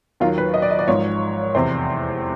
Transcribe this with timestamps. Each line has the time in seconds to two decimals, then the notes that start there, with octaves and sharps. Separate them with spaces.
0.20 D#2 D#3 F#3 F4
0.38 B4
0.54 D#5
0.62 D5
0.71 D#5
0.79 D5
0.88 G#1 G#2 F3 C#5
1.54 F1 E2 C3 C5